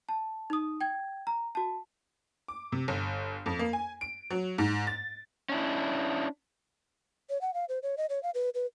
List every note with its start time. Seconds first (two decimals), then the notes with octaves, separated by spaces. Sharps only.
0.09 A5
0.50 D#4 D#6
0.81 G5 G#6
1.27 A#5
1.55 F#4 A5
2.48 D6
2.72 C3
2.88 G1
3.46 F2
3.59 A#3
3.73 G#5
4.01 D7
4.30 F#3
4.58 G#2
4.87 A6
5.49 C#4 D4 E4
7.30 C#5
7.41 F#5
7.54 F5
7.69 C5
7.83 C#5
7.97 D#5
8.09 C#5
8.23 F5
8.35 B4
8.55 B4